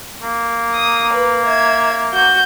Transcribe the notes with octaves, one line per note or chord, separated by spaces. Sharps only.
A#3
D#6
B4
E5 G#6
F#4 G6